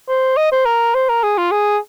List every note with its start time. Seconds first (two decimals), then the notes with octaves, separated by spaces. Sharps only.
0.08 C5
0.37 D#5
0.52 C5
0.66 A#4
0.95 C5
1.09 A#4
1.24 G#4
1.38 F4
1.52 G#4